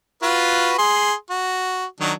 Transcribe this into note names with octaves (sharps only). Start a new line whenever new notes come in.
F4 F#4 B4
G#4 C6
F#4
D#3 F#3 D4